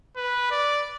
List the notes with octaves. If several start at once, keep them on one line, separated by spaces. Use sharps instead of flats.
B4
D5